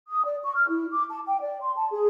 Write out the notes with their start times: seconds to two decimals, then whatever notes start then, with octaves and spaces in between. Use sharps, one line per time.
0.08 D#6
0.24 D5
0.43 C#6
0.55 F6
0.68 E4
0.91 D6
1.09 A5
1.25 G5
1.41 D5
1.59 C6
1.76 A5
1.91 G#4